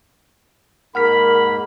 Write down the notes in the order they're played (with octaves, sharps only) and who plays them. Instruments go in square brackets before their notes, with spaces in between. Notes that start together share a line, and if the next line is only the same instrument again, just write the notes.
[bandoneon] G#2 A#3 [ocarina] A#4 [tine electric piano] F#5 F6 B6 [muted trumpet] B5